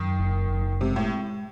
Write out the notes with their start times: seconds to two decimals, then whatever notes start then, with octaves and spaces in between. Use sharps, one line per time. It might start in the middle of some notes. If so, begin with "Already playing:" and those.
Already playing: F#2 D#3
0.19 F#1
0.50 F#1
0.81 C3 G#3
0.96 A2